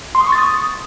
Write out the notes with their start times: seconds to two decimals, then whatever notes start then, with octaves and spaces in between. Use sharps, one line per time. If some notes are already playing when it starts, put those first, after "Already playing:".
0.15 C6
0.21 D#6
0.26 C#6
0.32 A6
0.38 D#6